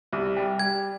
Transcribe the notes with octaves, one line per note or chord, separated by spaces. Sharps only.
C2
G3
G3 G#6